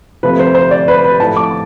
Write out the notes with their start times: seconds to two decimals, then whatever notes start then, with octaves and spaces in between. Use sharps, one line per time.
0.23 C3 F3 A3 B4
0.39 C5
0.55 C5
0.71 D5
0.88 B4
1.04 B4
1.20 A2 F3 A3 A5
1.36 D6